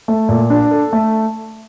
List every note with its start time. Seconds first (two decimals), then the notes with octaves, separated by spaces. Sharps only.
0.08 A3
0.29 A#2
0.50 D4
0.71 A4
0.93 A3